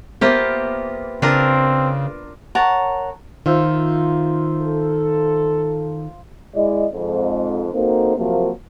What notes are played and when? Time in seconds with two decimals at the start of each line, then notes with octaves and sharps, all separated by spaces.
0.21 A#3 B3 F4 G4 C5 E5
1.22 C#3 C4 D4 F4 A#4
2.55 A#4 C#5 F#5 A5
3.46 D#3 F4 C5 E5
4.61 A4
6.55 G#3 E4 D5 D#5
6.93 F2 G#2
7.74 A#3 C4 D#4 F#4 A4
8.17 C3 F3 F#3 A#3